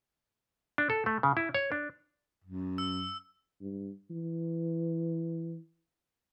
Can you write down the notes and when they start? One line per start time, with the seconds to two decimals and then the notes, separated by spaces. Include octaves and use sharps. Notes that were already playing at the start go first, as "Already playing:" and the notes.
0.78 D4
0.90 A4
1.06 A3
1.23 C#3
1.37 E4
1.54 C#5
1.72 D4
2.44 F#2
2.78 E6
3.61 G2
4.10 E3